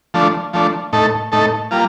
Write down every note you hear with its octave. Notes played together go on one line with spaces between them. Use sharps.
F3 A3 D4
F3 A3 D4
A2 A3 D#4 A4
A2 A3 D#4 A4
G3 A#3 F4